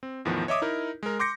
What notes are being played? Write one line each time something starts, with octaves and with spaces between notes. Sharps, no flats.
C4
E2 A2 D#3 F3 B3
C#5 D#5 E5 D6 D#6
D#4 E4 A#4
G#3 A#4
C6 D6 G6 A#6 C#7